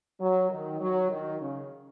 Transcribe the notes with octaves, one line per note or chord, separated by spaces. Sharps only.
F#3
D#3
F#3
D#3
C#3